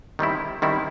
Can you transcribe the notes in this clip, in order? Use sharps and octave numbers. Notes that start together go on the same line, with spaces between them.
D#3 G3 C4 E4
D#3 G3 C4 E4